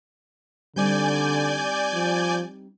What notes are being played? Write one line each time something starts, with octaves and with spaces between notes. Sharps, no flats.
D3 G3 C4 D#4 D5 G#5 G6
F3